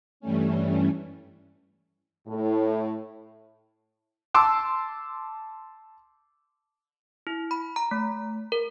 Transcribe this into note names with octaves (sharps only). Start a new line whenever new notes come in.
G2 E3 G3 A3 C#4
A2
A5 C6 D6 E6
E4
B5
A#5
A3
A#4